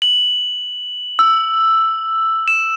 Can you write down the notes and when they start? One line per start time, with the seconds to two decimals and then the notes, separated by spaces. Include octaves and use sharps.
0.02 F#7
1.19 E6
2.48 E7